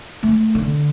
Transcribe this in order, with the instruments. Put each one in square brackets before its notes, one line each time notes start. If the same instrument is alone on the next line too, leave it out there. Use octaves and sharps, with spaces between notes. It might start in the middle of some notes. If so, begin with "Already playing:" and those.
[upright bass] A3
D3